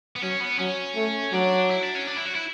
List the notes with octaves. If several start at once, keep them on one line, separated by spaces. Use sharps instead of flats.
B3
F#3 C#4
B3
F#3 C#4
A3
F#3 D4
E4
D4
C#4
D4
E4
F#4
E4